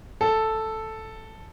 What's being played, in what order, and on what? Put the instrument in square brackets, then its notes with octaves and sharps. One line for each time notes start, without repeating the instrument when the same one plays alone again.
[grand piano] A4